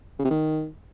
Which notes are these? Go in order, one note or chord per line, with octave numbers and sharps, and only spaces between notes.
C#3
C3
D#3